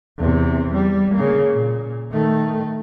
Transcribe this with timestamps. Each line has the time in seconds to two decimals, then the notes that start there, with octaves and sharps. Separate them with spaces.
0.18 E2 C3
0.74 G3
1.15 C#3 A#3
1.52 A#2
2.12 D#3 A3